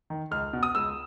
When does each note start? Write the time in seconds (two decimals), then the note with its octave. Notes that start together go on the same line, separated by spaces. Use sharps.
0.10 D#3
0.31 C#2 F6
0.53 B2
0.63 D#6
0.75 C#2 E6